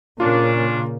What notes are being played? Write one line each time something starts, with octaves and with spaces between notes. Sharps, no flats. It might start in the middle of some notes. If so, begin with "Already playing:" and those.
A#2 C#3 A#3 C#4 D4 F4